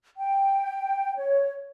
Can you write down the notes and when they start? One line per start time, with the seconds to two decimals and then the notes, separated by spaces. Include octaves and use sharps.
0.17 G5
1.18 C#5